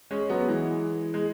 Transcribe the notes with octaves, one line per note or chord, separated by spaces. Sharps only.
G#3 C#4
F#3 B3
E3 G#3
G#3